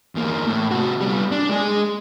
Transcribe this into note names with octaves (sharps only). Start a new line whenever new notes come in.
E2 A#3
A2
C3 F#4
G3 B3
D4
G#3 G#4